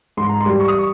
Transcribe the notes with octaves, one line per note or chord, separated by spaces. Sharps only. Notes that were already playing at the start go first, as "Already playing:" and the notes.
G#2 C6
A#5
C6
G3
C#6
D#6
C#6